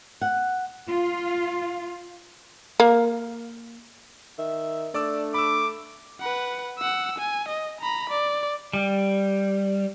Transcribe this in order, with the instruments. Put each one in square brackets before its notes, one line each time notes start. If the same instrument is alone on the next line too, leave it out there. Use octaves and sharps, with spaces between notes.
[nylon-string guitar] F#5
[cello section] F4
[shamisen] A#3
[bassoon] D#3 [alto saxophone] E5
[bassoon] A3 [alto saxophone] D4 [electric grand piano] D5 D6 E6
[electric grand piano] B5 E6 [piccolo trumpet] D6
[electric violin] B4 F#5
F#5 E6
G#5
D#5
A#5 B5
D5
[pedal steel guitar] G3